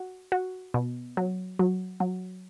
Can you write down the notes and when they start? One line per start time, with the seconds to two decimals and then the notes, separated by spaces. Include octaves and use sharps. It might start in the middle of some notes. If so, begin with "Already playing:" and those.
Already playing: F#4
0.32 F#4
0.74 B2
1.17 F#3
1.59 F#3
2.00 F#3